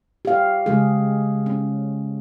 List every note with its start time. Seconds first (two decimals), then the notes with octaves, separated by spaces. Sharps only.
0.25 G4 F5
0.66 C#3 G#3 G#4
1.46 C#4